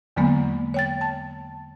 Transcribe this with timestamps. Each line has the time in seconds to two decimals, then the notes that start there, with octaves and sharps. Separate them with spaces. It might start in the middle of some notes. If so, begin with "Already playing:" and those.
0.16 E2 D3 F#3 G#3 A#3 B3
0.74 C#5 G5 A6
1.01 A5